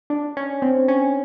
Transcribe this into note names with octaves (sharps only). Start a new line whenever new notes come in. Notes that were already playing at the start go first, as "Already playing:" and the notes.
D4
C#4
C4
C#4